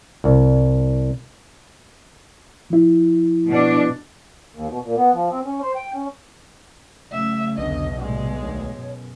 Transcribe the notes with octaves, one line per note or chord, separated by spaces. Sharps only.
C2
F3 E4
B2 D4
D#2
B2
A#2
B3
F3
C4
C#4
C5
G5
C#4
C#3 F#3 A3 C#4 E5
B1 E2 D3 D4 D#5
A2 C3 G3 G#3
D2 D#3 C#5
F#2 B2